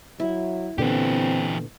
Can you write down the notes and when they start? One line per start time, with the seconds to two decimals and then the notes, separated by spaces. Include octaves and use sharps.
0.20 F#3 E4
0.78 A#2 D3 E3 B3 C4 G4